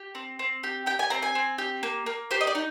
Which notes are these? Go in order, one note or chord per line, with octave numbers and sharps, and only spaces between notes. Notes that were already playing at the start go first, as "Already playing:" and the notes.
Already playing: G4
C4
C4
G4
G4 G5
G#5
C4 A#5
G#5
C4
G4
A#3
A#3
G4 C5
D#5
D5
D#4